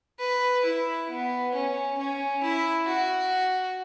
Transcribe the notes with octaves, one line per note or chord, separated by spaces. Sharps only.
B4
E4
B3
C#4
C#4
E4
F#4